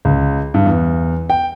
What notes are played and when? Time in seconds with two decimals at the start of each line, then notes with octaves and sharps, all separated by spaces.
0.05 C#2
0.54 G2
0.66 E2
1.30 G5